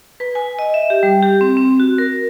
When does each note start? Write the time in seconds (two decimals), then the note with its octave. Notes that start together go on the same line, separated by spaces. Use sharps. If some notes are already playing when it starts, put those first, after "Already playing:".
0.20 B4
0.35 G#5
0.59 D#5
0.74 E5
0.90 G4
1.03 G3
1.23 G4
1.41 C4
1.57 C4
1.80 F#4
1.98 A#4